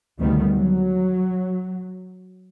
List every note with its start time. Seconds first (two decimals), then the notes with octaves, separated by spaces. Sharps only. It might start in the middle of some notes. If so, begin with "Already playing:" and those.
0.19 D2 C3 D#3 G3 A3 B3
0.54 F#3